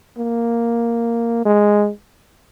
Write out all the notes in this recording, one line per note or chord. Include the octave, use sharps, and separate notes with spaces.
A#3
G#3